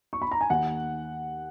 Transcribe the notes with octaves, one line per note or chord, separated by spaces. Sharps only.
C#6
B5
A#5
G#5
D#2 F#5